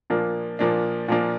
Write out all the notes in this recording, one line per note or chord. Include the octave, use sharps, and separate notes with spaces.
A#2 F3 A#3 D4
A#2 F3 A#3 D4
A#2 F3 A#3 D4